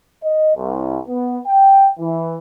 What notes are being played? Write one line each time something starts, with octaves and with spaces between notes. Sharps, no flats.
D#5
C2
B3
G5
E3